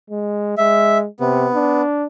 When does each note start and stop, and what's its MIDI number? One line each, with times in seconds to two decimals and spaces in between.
0.10 0.54 56
0.58 1.06 56
0.58 0.98 76
1.20 1.49 48
1.20 1.82 59
1.54 2.07 62